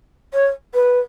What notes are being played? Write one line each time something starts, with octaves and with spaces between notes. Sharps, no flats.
C#5
B4